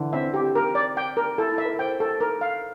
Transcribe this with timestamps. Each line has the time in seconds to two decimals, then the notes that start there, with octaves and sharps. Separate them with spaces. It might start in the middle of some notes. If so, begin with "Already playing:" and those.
Already playing: D3 E3
0.13 C4 E5
0.34 G4
0.55 A#4
0.75 D5
0.97 G5
1.17 A#4
1.38 E4 A4
1.51 E4
1.58 E5
1.65 A#4
1.79 C5 G5
2.00 A4
2.21 A#4
2.41 F5